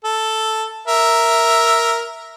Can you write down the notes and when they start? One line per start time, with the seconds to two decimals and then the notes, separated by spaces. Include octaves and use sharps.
0.04 A4
0.87 A#4 E5